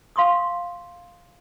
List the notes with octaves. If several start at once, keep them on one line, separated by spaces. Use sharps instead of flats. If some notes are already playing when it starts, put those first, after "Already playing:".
F5 C6 C#6 D#6